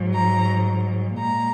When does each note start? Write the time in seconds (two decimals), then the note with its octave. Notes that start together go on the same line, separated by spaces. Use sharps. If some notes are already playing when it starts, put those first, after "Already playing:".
Already playing: G#2 F#3
0.15 A#5
1.19 A#2 G#3 A#5